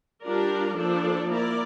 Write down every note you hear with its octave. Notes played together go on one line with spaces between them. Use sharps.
G3 D4 F4 A#4 D5
F3 A#3 D4 A4 D5
A#3 E4 A#4 D5